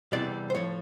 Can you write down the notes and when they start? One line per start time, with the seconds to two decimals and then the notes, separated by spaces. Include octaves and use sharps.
0.12 E2 C3 E3 G3 D5
0.50 C5
0.55 A2 F3 C#5